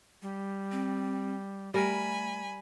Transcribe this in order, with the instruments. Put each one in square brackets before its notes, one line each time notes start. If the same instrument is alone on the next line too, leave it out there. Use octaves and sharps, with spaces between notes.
[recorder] G3
[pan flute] C4
[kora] G3 A#4 [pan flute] A3 [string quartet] G#5 B5